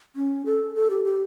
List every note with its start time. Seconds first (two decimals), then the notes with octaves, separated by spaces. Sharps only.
0.16 C#4
0.46 A4
0.75 A4
0.90 G4
1.05 G4